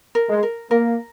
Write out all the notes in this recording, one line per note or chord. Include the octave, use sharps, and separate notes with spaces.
A#4
G#3
A#4
A#3 A#4